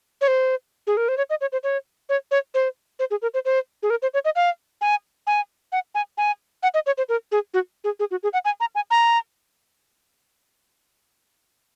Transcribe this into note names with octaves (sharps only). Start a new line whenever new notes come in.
C#5
C5
G#4
A#4
C5
C#5
D#5
C#5
C5
C#5
C#5
C#5
C5
C5
G#4
A#4
C5
C5
G#4
A#4
C5
C#5
D#5
F5
G#5
G#5
F#5
G#5
G#5
F#5
D#5
C#5
C5
A#4
G#4
F#4
G#4
G#4
F#4
G#4
F#5
G#5
A#5
G#5
A#5